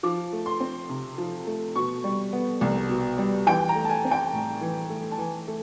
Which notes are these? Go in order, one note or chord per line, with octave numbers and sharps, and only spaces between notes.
F3 D6
A3
C6
C4
C3
F3
A3
B2 C#6
G3
B3
C2
B2
G3
E3 G5
A#5
A3
A5
G#5
C4
G5
A2
E3
A3
A5
E3 G#5
A3